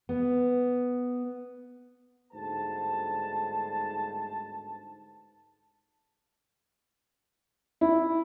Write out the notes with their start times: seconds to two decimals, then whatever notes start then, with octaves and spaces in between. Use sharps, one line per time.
0.09 B3
2.32 G1 D2 G#2 C5 A5
7.81 E4